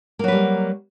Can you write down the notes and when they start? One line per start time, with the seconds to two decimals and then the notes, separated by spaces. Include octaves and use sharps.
0.19 A#3
0.24 F#3
0.28 B4
0.32 G3